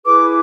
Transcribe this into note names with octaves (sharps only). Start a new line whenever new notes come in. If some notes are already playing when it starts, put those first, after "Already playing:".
E4 G#4 B4 D6